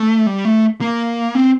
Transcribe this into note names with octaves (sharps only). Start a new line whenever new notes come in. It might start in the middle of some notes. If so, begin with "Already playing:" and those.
Already playing: A3
G3
A3
A#3
C4